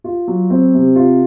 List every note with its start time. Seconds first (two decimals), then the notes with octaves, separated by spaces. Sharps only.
0.04 F4
0.28 F#3
0.50 C4
0.74 C3
0.96 F4